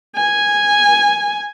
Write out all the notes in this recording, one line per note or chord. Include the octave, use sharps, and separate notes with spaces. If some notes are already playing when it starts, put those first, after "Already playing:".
G#5